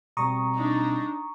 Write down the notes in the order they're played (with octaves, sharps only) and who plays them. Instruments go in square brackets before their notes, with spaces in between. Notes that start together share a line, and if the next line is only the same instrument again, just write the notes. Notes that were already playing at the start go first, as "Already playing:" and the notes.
[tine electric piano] B2 G3 C4 [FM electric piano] A#5 C#6 D#6
[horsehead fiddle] D4 D#4